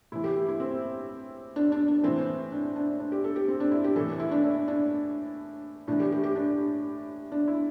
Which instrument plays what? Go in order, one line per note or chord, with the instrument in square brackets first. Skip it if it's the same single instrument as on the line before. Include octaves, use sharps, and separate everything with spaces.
[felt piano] A2 E3 E4
G4
G4
E4
C4
D4
D4
D4
A2 E3 C4
D4
D4
D4
G4
A4
G4
C4
D4
E4
G4
A2 E3 A4
E4
D4
D4
D4
A2 E3 D4
G4
G4
G4
D4
D4
E4